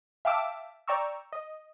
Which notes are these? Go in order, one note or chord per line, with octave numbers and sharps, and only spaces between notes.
E5 F5 G5 A5 D6 E6
D5 G5 A#5 C#6 E6
D#5